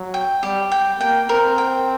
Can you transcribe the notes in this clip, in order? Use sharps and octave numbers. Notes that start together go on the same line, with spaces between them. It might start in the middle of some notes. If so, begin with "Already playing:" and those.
Already playing: F#3
G5
G3 G4
G5
A#3 G5
C4 A#4
G5